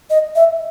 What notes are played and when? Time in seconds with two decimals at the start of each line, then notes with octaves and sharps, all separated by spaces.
0.10 D#5
0.35 E5